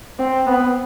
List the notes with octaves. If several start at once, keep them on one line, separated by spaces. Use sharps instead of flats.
C4
B3